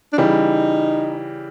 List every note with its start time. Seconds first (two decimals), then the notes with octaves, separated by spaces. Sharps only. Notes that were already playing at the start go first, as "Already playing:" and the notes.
0.13 D4
0.18 C#3 E3 G3 D#4